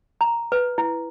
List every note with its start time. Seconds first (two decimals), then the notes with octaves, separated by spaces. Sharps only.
0.21 A#5
0.52 B4
0.78 E4